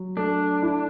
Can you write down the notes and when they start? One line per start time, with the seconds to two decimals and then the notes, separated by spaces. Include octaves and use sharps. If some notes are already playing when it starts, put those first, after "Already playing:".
Already playing: F#3
0.17 A3 D4
0.62 E4